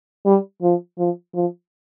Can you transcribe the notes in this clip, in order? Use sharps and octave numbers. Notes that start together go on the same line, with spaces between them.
G3
F3
F3
F3